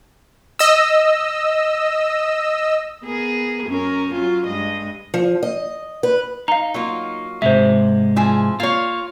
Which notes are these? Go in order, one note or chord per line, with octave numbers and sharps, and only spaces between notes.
D#5 E6
B3 G#4 A#4
F#2 C#4 A#4
F#3 C#4 F4
G2 G#3 D#5
F3
D#5
B4
D#4 F5 A#5
F#3 A#3 F4
G#2 C3 G#3 C5 E5
E3 F3 G#4
A#3 F4 C#5